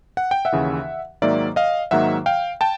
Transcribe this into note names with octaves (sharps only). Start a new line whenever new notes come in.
F#5
G5
E5 F#5
D#2 C#3 E3
G#2 D#3 F#3 A#3 D5 E5
D#5 F5
G#2 D#3 F#3 A#3 E5 F#5
F5 G5
G5 A5